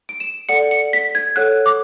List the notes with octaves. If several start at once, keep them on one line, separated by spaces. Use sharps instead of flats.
D7
E7
A4 D5 F#5 C#7
C#7
B6
G#6
A4 C#5 F#5 F#6
D6